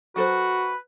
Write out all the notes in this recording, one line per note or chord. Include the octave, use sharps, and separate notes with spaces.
F#3 F#4 A4 B4 C5